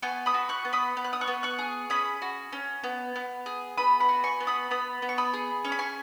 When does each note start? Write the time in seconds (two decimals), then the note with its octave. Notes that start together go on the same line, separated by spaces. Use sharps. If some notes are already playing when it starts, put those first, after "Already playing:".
0.02 B3 G#5 C#6
0.26 B5 D#6
0.34 F#4
0.49 C#6 F#6
0.65 B3
0.73 B5 D#6
0.97 B3
1.04 F#6
1.13 D#6
1.21 C#6 F#6
1.27 B3
1.43 C#6 F#6
1.59 G#4
1.90 C#4 B5 D#6
2.22 F#4
2.52 C#4
2.83 B3
3.16 B3
3.46 G#4
3.77 B3 B5 D#6
4.00 F#5 B5
4.09 F#4
4.24 G#5 C#6
4.40 B3
4.47 B5 D#6
4.71 B3 B5 D#6
5.02 B3
5.09 C#6
5.18 B5 D#6
5.34 G#4
5.65 C#4 C#6
5.72 B5
5.79 G#5 C#6